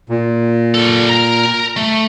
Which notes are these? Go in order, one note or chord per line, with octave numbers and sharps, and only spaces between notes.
A#2
G3 A4
A#4 A#5
A3